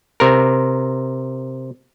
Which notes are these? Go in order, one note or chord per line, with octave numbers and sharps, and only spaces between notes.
C3 A#4